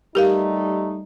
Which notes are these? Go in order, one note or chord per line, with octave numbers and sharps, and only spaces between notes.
G3 A3 D#4 G4 A#4 F5